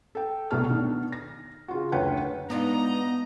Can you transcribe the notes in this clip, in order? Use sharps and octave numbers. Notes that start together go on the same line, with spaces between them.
A4 G5
C2 B2 A3 A5 F6
D#3 B3 D4
A#6
C#3 F4 F#4
F#1 D2 B4 C#5 F#5 G5
G#2 B3 D4 D#4 F4 D#5 A#5